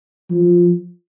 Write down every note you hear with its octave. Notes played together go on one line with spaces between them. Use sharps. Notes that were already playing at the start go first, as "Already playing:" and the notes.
F3